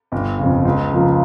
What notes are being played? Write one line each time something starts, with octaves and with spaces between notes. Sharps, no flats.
G1
F2 C#3
C#2
C#3 F3 A#3